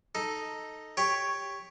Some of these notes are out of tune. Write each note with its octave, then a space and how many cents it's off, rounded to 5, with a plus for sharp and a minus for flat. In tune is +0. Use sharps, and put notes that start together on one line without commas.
D#4 +0 A4 +0
G4 +15 C#5 +0 G5 +5